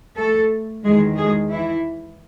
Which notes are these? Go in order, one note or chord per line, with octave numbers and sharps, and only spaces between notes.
A3 A4
E2 D#3 G#3 G#4
G#3 G#4
E3 E4